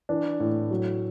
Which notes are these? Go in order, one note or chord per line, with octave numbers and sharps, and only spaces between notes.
E3 D4
A2
F#3